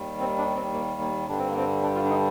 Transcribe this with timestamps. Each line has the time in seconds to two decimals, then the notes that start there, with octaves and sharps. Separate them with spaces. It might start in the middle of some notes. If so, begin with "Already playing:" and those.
Already playing: D#2 D#3 G3
0.20 C4
0.38 D4
0.56 C4
0.73 A#3
1.01 A#3
1.28 G2 D3 G3 D4
1.38 C4
1.48 A#3
1.57 C4
1.82 D4
1.95 F4
2.04 D4
2.10 D#4